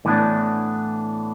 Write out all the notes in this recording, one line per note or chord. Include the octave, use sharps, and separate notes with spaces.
A2 E3 B3 D4